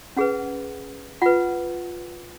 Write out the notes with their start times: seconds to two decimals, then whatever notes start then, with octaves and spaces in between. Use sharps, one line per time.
0.17 C#4 G#4 B4 F#5
1.22 F4 B4 F#5